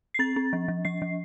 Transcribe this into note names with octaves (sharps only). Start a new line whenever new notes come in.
C7
C4 A6
C4
F3
F3
F3 C7
F3